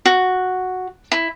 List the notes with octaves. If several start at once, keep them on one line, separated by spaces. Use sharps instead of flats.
F#4
E4